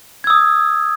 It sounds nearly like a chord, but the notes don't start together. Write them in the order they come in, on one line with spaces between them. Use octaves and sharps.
G#6 E6 D#6